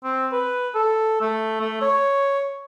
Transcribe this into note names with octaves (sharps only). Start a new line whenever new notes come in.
C4
B4
A4
A3
A3
C#5